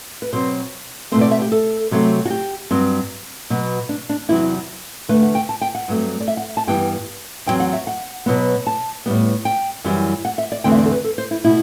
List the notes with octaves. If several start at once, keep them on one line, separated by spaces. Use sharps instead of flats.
B4
B2 F#3 C4 C5
B2 A3 C4 C5
D5
E5
G4
A4
C3 F#3 A3 C4
F#4
G4
G2 F#3 C4
B2 F#3 B3
D4
D4
E2 C3 F#3 E4
E2 D3 A3 B4
F#5
G5
A5
G5
F#5
G2 F#3 A3 C4
D5
E5
F#5
A5
G2 E3 G3 B3 G5
E2 C3 F#3 C4 G5
F#5
E5
F#5
B2 F#3 B3
A5
A2 G3 B3
G5
F#2 E3 G3
F#5
E5
D5
E2 D3 A3 C4 G5
E5
D5
A4
B4
A4
C5
E4
B2 A3 E4